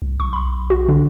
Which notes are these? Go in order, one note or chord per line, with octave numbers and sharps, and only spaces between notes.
C2
B1 C#6
B5 C6
F#4
D3 D4